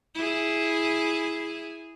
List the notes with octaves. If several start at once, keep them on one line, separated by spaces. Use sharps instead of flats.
E4 G#4